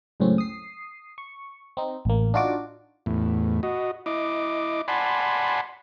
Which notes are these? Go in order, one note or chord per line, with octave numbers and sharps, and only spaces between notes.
C#2 F#2 A2 C#3 C4 C#4
D#6 C7
C#6
C4 D#4
A1 A#3
D4 D#4 F4 F#4 D5 D6
E2 A2
F#4 D#5
E4 D#5 D6
D5 F#5 G#5 A5 B5 C6